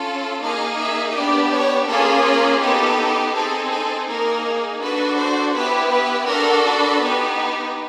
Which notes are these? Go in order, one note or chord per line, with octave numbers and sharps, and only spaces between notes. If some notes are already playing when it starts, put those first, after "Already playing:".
Already playing: C#4 F4 A4
A#3 D#4 G#4 F5
E5
B3 D4 G4 D5
C#5
A#3 C#4 F4 G#4 A4
A#4
B3 D#4 G4 A4
C4 D#4 G#4 A4
A4
A#3 D#4 G#4 A#4
D4 F#4 A4 B4
C5
B3 E4 G4 B4
B4
D4 F#4 A4 A#4
B4
B3 D#4 G4